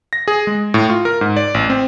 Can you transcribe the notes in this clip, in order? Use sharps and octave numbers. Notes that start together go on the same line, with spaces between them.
A#6
G#4
G#3
A2
F4
A#4
G#2
D5
A1
C4